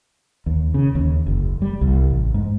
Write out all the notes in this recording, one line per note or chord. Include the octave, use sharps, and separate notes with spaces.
D#2
C#3
D#2
F#1
G3
C2
A1
G#2